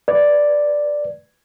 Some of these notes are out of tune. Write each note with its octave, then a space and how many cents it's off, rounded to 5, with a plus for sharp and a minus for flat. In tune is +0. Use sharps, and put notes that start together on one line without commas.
B4 +0 D5 +0